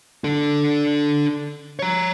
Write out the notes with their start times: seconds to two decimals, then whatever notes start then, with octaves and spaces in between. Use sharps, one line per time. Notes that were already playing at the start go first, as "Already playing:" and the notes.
0.24 D4 A4
1.79 C#5 A#5